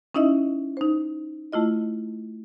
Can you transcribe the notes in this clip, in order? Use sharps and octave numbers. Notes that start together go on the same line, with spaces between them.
C#4 D#4 E4 D#5 E5
D#4 C5
A3 E4 F4 D#5